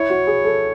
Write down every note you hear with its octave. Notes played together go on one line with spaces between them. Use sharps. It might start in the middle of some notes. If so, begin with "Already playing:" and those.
Already playing: E4 C#5
F#4
G#4
A4